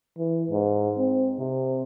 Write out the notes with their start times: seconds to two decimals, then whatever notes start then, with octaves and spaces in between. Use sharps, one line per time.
0.18 E3
0.51 G#2
0.98 C4
1.39 C3